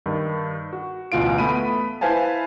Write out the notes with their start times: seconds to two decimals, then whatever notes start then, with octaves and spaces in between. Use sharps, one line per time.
0.06 G2 D#3
0.73 F#4
1.12 A1 D2 B2 F4 F5 D7
1.38 A3 B3 B5 D#7
2.01 E4 B4 C5 F5 G#5 A5